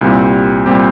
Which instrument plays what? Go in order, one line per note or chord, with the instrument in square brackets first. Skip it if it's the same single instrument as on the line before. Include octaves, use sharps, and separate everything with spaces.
[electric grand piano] C2 A#2 G3 C4 G4
A#2 G3 C4 G4